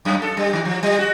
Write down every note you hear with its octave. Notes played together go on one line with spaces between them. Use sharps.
F#2
A4
G3
D#3
F3
G3
F#4